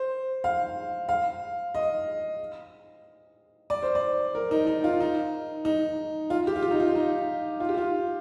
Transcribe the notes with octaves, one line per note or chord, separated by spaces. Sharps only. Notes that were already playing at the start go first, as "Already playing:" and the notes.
Already playing: C5
F5
F5
D#5
D5
C5
D5
A#4
D#4
D#4
F4
D#4
D#4
F4
G4
F4
G4
D#4
F4
D#4
F4
G4
F4